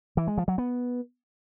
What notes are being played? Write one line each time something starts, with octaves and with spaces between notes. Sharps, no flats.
E3
G#3
F3
F#3
B3